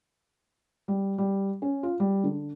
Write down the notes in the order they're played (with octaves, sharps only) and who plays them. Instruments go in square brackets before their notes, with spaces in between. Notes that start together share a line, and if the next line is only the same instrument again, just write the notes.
[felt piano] G3
G3
C#4
F4
G3
D3